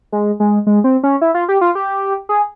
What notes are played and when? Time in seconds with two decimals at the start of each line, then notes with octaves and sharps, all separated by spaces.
0.12 G#3
0.40 G#3
0.67 G#3
0.84 C4
1.03 C#4
1.21 E4
1.34 F4
1.49 G4
1.61 F4
1.75 G4
2.29 G#4